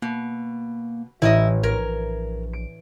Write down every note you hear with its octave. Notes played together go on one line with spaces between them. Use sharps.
B2 A#3
A1 E3 E4 D5 D#5
A#1 A#4 G#6
D7